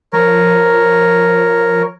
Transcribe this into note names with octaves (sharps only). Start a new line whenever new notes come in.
F3 A#4 C#5